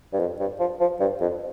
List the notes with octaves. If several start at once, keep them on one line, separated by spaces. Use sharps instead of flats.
G2
F2
G2
F3
F3
G2
F2